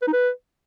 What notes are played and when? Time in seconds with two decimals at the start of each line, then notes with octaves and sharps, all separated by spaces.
0.02 B4
0.07 D#4
0.13 B4